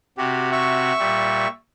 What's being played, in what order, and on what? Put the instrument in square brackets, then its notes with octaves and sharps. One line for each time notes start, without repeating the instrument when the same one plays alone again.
[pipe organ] C3 F#4 [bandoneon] G4
[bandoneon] E5 C#6
[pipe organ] A#2 G3